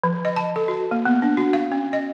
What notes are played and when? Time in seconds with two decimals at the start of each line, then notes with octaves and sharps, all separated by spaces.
0.04 F3
0.25 D#5
0.36 A5
0.56 A4
0.68 F#4
0.91 A#3
1.05 B3
1.22 D4
1.37 F#4
1.53 F5
1.72 C#4
1.93 D#5